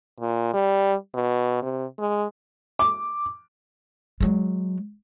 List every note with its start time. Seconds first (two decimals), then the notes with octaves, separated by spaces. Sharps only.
0.20 A#2
0.54 G3
1.15 B2
1.62 C3
1.99 G#3
2.79 D6
4.21 F#3 G#3